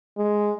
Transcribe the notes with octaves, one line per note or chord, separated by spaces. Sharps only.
G#3